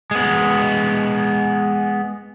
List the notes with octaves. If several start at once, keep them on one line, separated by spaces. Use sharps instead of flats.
G#3 B3